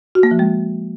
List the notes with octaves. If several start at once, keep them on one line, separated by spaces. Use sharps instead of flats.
F#4
A#3
F3
G#3